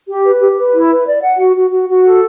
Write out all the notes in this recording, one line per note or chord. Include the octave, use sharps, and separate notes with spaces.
G4
B4
G4
B4
E4
B4
D5
F#5
F#4
F#4
F#4
F#4
A4